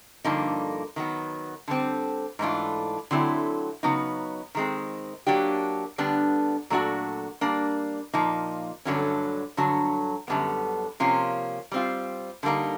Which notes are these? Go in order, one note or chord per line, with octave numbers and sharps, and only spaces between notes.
G2 D3 F3 A#3 D#4
D#3 F#3 B3
D3 G3 C4
G#2 E3 A3 D4 F4
D3 F#3 A3 C4 E4
C#3 F#3 B3 D#4
D#3 G#3 C4
F#3 A#3 D4 G4
D3 G3 B3 D4
A#2 F#3 A3 D4 F#4
G3 A#3 D4
A#2 F3 A#3 D#4
G2 D3 F#3 A3 C#4
G2 D3 F#3
F#2 D3 G3 B3
C3 F3 A#3 C#4 F4
G3 C4 F4
D3 G3 A#3 D#4